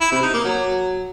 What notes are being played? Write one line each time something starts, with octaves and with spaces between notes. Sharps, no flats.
E4
C3
D#4
A#3
F#3